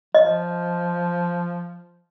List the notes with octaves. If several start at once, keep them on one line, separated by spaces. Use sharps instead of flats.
F3 D#5